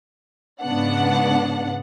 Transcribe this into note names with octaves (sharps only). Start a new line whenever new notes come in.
G#2 C#3 B3 D4 F#5